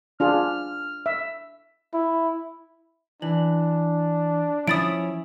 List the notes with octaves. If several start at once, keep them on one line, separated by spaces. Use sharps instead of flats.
D4 F4 G#4 F6
E5
E4
E3 D4 F#7
F3 C#4 E4 C#5 B5 D#6 A6 D7